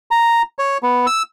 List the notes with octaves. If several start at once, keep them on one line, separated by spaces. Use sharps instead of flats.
A#5
C#5
B3
E6